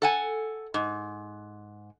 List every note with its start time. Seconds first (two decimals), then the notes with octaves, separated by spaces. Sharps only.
0.02 A4 F#5 G#5
0.74 G#2